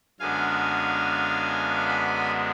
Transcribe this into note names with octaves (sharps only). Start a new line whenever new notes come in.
F#2 D3 G#3 B3 D4 F5 G#5
G#5 B5